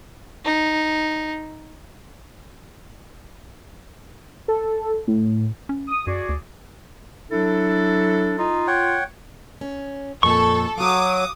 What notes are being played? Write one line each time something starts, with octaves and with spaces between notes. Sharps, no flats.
D#4
A4
A2
C#4
D#6
F#2 F#4 G#4 D5
D2
F#3 D4 E4 A4
D#4 F4
C#5 F#5 G5
C#4
F2 A#2 A4 C#6
F#3 F#4 F5 D6 D#6